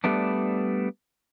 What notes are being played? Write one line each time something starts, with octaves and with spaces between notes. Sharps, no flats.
G3 A3 B3 D4